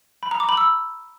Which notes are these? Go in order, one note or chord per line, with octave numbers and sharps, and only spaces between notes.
B5
A#5
D6
B5
E6